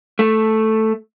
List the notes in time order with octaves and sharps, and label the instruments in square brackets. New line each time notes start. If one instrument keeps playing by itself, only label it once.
[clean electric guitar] A3